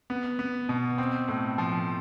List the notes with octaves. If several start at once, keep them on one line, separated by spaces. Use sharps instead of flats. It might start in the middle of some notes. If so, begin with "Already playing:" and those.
B3
B3
B2
C4
A2
F3